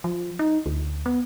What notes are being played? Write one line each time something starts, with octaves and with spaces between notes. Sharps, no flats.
F3
D#4
D2
B3